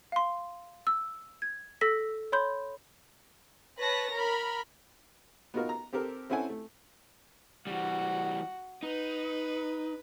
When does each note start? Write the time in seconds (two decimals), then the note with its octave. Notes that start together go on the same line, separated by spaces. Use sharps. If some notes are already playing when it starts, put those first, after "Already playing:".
0.12 F5 C6
0.87 E6
1.42 G#6
1.81 A4 E6 A#6 B6
2.32 C#5 B5 C6 G6
3.81 B4 C#5 A5 A#6
4.15 A#4 B5
5.54 B3 D#4 F4 F#4 A#4
5.69 A#5
5.93 C4 G4 A4 A#4
6.30 C4 C#4 E4 A4 F#5 G#5
6.49 A3
7.67 E3 G3 F#4
8.83 D#4 B4